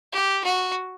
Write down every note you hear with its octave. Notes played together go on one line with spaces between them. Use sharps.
G4
F#4